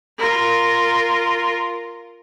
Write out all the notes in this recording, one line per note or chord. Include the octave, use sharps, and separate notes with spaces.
F4 A#4